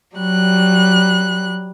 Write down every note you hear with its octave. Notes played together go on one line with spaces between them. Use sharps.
F#3 G3 F#6